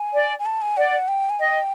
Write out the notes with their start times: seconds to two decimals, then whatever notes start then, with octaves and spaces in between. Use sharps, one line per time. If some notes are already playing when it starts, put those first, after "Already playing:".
Already playing: G#5
0.14 D5
0.39 G#5
0.46 A5
0.62 G#5
0.77 D5 F#5
1.08 G5
1.30 G#5
1.39 D#5 G5